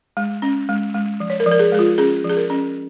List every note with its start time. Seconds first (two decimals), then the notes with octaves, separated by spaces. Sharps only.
0.17 G#3
0.42 C#4
0.69 G#3
0.94 G#3
1.20 F3
1.30 C#5
1.40 A#4
1.46 F3
1.51 A#4
1.59 G#4
1.72 G#3 G#4
1.79 F4
1.98 C#4 G#4
2.24 F3
2.30 G#4
2.37 A#4
2.50 C#4